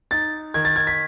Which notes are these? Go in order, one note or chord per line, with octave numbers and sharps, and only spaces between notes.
D#4 A6
D#3 G#6
A6
G#6
B6